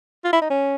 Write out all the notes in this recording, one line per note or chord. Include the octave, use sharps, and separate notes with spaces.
F4
E4
D#4
C#4